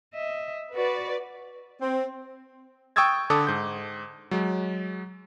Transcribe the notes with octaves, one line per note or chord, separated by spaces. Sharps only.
D#5 E5
F#4 B4 D5
C4
G5 C#6 D#6 E6 G#6 A6
D3 A4 D6 D#6
G#2 G6
F#3 G#3